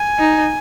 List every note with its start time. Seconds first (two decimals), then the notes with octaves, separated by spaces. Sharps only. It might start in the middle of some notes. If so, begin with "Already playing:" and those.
Already playing: G#5
0.19 D#4